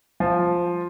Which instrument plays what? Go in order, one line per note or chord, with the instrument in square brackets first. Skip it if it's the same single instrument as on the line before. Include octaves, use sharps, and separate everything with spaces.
[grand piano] F3